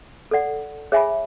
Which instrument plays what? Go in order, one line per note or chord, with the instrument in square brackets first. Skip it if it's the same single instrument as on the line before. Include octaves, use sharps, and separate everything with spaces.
[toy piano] A4 D5 F#5
G#4 C#5 E5 G#5 B5